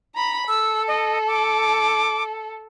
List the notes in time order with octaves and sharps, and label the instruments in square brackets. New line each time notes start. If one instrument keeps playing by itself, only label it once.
[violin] A#5 B5
[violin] A4 [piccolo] E6
[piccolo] D#5
D6